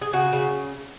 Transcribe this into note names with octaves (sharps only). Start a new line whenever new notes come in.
G#4
C#3 F#4
C#3